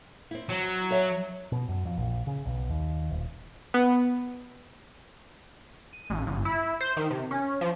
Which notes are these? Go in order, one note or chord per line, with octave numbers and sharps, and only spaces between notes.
C4 E4
F#3
C#5 E5
B2
F#2
F2
A#1
C#3
B1
D#2
D#1
B3
D#7
A1
G1
E4
C5
D#3
C3
C#4
F3